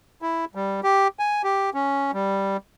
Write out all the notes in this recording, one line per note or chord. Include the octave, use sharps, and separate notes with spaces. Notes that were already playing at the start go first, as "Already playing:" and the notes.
E4
G3
G4
G#5
G4
C#4
G3